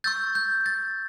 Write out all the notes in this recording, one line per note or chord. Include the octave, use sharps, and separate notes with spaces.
C#6 E6 G6 A6
G6
A6